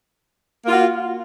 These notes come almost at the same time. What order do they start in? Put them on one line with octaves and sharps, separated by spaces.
A#3 F4 F#4